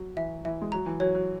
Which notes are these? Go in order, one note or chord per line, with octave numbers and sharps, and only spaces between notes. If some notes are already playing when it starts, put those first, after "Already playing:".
Already playing: F#3
E3 E5
E3 E5
G#3
F#3 A#5
E3
F#3 C#5
F#3